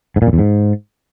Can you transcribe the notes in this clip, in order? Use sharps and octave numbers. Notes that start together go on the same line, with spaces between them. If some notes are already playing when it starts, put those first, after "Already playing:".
G#2
A#2
F#2
E2
G#2